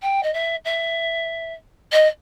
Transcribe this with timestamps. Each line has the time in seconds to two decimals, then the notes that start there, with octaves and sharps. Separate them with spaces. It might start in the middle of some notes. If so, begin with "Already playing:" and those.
0.02 G5
0.23 D#5
0.34 E5
0.65 E5
1.92 D#5